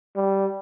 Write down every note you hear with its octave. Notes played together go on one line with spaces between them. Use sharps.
G3